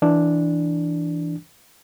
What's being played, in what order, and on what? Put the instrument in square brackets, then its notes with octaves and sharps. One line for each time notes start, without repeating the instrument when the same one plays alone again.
[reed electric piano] E3 D4